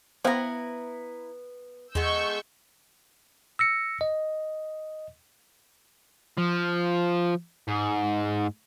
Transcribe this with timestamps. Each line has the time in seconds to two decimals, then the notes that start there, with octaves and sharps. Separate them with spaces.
0.24 B3 E4 C5 F5 G5 A#5
1.95 E2 G#3 A3 B3 C#6 E6 G6
3.59 E6 A#6 C#7
4.01 D#5
6.38 F3
7.68 G#2